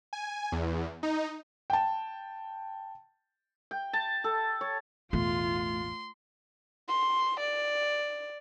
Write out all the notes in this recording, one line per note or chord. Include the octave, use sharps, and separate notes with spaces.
G#5
E2
D#4
G5 A5
G5
A5
A4
C#5
A1 E2 B2 A3 F4 C6
C6
D5